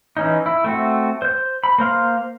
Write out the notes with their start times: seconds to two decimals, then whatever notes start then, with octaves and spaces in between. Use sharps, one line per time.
0.17 E3 C#4 D#4
0.46 E4
0.64 A3 C4 F#4
1.22 C5 G6
1.64 B5
1.78 A#3 C5 F5 C6